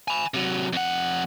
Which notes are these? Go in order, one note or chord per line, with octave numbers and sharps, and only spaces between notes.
G#5 B5
C3 F#3
F2 F#5